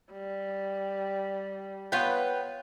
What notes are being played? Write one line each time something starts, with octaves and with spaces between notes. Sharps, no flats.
G3
B3 F4 B4 C#5 G5